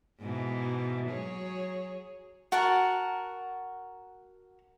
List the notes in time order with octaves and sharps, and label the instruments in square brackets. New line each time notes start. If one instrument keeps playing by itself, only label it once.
[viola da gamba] G#2 B2 E3
F#3 G#4 C#5
[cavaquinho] F#4 A#4 F#5 A5